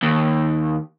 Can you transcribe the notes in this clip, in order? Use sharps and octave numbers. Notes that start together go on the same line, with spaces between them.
D#2